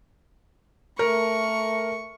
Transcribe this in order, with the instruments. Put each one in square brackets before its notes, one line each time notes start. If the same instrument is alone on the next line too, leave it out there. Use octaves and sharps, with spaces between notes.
[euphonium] A3 [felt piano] A#4 [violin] C#6